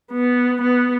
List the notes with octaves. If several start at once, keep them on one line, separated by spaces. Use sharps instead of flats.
B3
B3